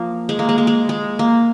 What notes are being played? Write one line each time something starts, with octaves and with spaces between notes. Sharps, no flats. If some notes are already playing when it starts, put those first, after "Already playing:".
Already playing: F3 A#3
G#3
A#3
G#3
A#3
G#3
G#3
A#3